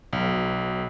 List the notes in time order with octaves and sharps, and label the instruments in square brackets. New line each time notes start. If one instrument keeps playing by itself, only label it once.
[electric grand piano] B1